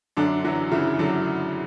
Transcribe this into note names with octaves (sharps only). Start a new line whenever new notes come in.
F#2 D3 D4
E3 F#3 E4
C#3 E3 E4
D3 F#3 D4